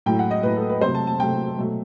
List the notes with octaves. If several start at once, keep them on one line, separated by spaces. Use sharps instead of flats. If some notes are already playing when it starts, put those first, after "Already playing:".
A2 F#3 A3 G5
F#5
D#5
A2 F#3 A3 B4
A4
B4
C3 F#3 A3 C5
A5
A5
C3 F#3 A3 G5
B2 F#3 A3